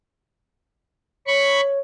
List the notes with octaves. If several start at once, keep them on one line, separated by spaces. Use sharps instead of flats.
C#5 B5 C#6